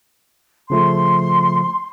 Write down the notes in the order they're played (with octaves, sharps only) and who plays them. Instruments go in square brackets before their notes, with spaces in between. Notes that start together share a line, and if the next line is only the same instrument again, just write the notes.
[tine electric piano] C#3 F3 A3 [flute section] C6